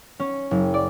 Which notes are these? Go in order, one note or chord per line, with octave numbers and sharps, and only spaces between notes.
C#4
F#1
D5